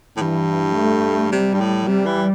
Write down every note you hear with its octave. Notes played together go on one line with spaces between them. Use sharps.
A2
G2 E3
A3
C3 G3
G2
A2
C3 G3
E3